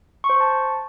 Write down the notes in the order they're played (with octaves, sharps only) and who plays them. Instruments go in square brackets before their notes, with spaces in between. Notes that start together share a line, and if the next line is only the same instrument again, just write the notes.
[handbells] C#6
C5
C#6
A5